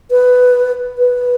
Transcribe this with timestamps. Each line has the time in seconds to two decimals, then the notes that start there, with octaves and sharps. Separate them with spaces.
0.11 B4
0.98 B4